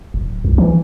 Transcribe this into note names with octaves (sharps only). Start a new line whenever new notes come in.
D1
C2
E3